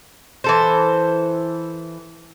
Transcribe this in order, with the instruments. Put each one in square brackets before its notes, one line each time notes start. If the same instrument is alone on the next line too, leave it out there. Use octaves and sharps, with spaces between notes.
[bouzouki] E3 A4 C5